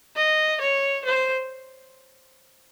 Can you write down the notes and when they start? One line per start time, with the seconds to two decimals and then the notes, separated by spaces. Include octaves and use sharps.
0.16 D#5
0.61 C#5
1.05 C5